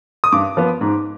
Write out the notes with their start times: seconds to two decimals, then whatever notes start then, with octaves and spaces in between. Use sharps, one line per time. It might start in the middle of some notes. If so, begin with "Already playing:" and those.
0.24 D#6
0.32 G2 D6
0.57 F3 B3
0.81 G#2